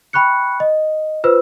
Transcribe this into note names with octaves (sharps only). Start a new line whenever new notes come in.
G5 B5 C#6 F#6 C#7
D#5
F4 B4 C5 E6